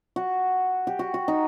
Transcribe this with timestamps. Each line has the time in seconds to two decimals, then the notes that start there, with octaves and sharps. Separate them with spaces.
0.16 F#4
0.87 G4
0.99 F#4
1.14 F#4
1.28 D#4